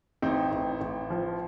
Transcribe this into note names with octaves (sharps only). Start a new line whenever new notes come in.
A1 C4 D#4
A1
A1
F3